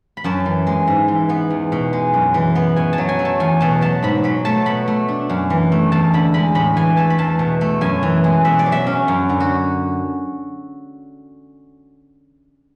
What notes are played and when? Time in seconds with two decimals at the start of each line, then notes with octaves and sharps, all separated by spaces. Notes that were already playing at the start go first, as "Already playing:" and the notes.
0.17 B5
0.24 F#2 A5
0.46 E3
0.67 G#3
0.88 G#2
1.08 E3
1.29 B3
1.50 E2
1.72 B2
1.93 G#3
2.14 F#2
2.34 E3
2.55 B3
2.76 B2 G#5
2.93 A5
2.98 F#3
3.09 G#5
3.19 A3
3.25 A5
3.40 E2 G#5
3.60 B2 A5
3.81 F#3 A5
4.03 G#2 B5
4.24 F#3 B5
4.45 A3 A5
4.66 B2 B5
4.88 A3
5.08 D4
5.30 F#2
5.50 E3
5.72 A3
5.92 E2 A5
6.14 D3 B5
6.34 G#3 B5
6.55 A2 B5
6.77 E3 G#5
6.97 A3 A5
7.10 B5
7.18 E2 A5
7.39 B2
7.61 A3
7.81 F#2 G#5
8.03 E3
8.24 G#3
8.45 B2 E5
8.59 D5
8.66 F#3
8.72 E5
8.87 C#4
9.08 F#2
9.29 D3
9.40 F#4